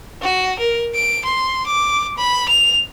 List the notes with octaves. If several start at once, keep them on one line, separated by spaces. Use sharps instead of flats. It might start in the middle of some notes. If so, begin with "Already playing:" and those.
F#4
A#4
D7
C6
D6
B5
F7